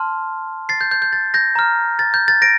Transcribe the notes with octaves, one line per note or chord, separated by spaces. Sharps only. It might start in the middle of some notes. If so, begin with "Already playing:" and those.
Already playing: A5 C6 F6
A6 C7
G6
G6
G6
A6
G6 A#6
A#5 F6
A6
G6
A6
A#6 D7